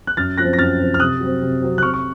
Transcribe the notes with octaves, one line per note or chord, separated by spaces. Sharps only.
F#6
F#2 F6 A6
F3 F#6 A#6
C4
A#6
F#2 F6 A6
F3 C4
F6
C3 D#6 F#6
F#3 C4
C3
F#3 C4
F#6
C3 C#6 F6
C#6